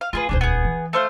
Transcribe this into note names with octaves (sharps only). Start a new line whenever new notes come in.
F5
A3 F4 G#4 B4
D#1 C#2 D4 G#4 C5
B3 G#4
E3
A3 C5 F5